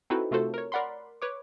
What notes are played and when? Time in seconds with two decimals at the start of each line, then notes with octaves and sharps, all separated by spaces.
0.10 C4 D#4 E4 F#4 A4 B4
0.31 C3 A3 F4 F#4 A4 C5
0.54 A#4 C#5
0.72 A#4 D5 F#5 B5 C6
1.22 B4 C#5 D6